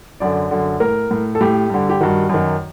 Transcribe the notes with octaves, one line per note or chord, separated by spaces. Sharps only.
F#2 D3 D5
F#2 D3
A2 A#4
A2
A4
A2 G4
G2 D3
G4
G2 D#3 F#4
F#2 D#3